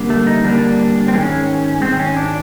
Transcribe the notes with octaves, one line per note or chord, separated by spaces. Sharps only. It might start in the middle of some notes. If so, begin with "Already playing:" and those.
Already playing: D3 G3 A#3
A3
D#4
D3 G3 A#3 D4
C4
G#2 D#3 G#3 C#4
G#2 D#3 G#3 C4
C#4
D4